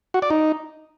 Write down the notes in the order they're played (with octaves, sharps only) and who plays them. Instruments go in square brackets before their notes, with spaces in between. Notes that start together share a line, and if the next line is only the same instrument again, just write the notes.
[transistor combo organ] F#4
D5
D#4